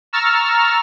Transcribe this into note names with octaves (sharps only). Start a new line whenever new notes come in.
A#5 C#6 E6 F6 A6